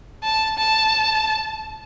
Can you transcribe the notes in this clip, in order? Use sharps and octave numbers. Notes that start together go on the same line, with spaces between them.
A5
A5